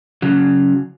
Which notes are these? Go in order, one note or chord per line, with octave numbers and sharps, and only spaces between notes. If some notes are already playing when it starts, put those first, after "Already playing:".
C#3 F#3